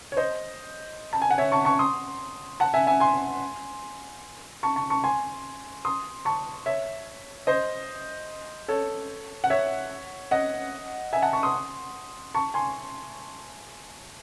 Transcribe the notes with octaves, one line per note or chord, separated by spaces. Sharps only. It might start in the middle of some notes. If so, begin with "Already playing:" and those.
C#5
C5 D#5
A5
G#5
F#5
C#5 E5
A5 C#6
A5 C#6
C6 D#6
F#5 A5
E5 G#5
E5 G#5
G#5 C6
A5 C#6
A5 C#6
A5 C#6
G#5 C6
C6 D#6
A5 C#6
C#5 E5
C5 D#5
A4 C#5
F#5
C#5 E5
D#5 F#5
E5 G#5
F#5 A5
A5 C#6
C6 D#6
A5 C#6
G#5 C6